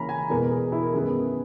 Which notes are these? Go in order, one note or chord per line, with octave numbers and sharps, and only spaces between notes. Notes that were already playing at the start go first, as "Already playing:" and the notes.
Already playing: C#3 E3 A#3 C#4 A#5 B5
G#5
E2 B2 G#3 B3 A#4
G#4
E4
A#4
F#2 D#3 G#3 B3 G#4